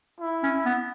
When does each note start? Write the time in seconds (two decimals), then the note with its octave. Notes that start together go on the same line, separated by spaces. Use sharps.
0.20 E4
0.43 C#4
0.66 B3